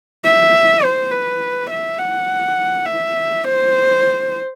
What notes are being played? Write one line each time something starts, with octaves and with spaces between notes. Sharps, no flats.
E5
C5
B4
E5
F#5
E5
C5